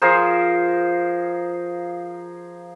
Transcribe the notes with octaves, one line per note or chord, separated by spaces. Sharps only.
F3 G#4 A#4 C5